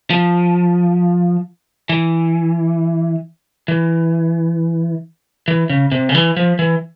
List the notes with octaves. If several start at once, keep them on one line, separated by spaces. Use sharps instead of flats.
F3
E3
E3
E3
C#3
C3
C#3
E3
F3
E3